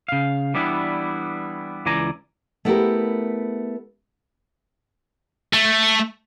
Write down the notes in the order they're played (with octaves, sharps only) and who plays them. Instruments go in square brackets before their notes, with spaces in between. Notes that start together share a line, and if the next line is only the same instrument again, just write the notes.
[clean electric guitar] C#3 F5
E3 G3 B3 D4 E4
C#2 E3 D5 G#5 A#5
[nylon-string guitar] A3 B3 E4 F#4 G4 A#4
[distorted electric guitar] A3